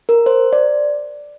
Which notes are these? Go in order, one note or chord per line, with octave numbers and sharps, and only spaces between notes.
A#4
C5
D5